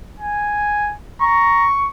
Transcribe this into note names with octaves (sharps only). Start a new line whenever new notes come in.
G#5
A#5 C#6